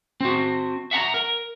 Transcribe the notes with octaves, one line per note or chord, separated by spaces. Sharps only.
C4 F#4
E5 F#5 A5 A#5
A#4